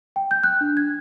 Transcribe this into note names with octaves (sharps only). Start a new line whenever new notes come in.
G5
G6
F#6
D4
G#6